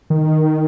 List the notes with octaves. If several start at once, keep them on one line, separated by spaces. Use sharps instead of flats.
D#3